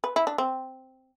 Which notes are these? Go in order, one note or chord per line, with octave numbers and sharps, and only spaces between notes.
B4
E4
D4
C4